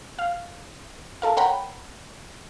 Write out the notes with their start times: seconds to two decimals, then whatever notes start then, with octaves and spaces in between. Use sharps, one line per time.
0.19 F5
1.22 A4 A#4 F5
1.37 A#4 C#5 F#5 G5 A#5 B5